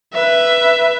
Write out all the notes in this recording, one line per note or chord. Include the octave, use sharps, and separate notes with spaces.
B4 E5